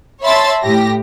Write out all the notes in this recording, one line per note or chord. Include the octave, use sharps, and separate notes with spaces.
C#5 E5 A5 B5 C6 A6
A2 G4 A#6